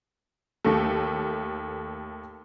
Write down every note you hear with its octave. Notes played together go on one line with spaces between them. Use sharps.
D#2 A3